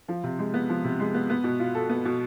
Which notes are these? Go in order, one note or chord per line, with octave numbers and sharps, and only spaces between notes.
F3
C3
G#3
B3
F3
C3
G#3
B3
B3
B2
F4
A4
B3
B2